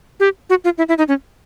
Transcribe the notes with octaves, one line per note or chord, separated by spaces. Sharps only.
G4
F#4
F4
E4
E4
D#4
C#4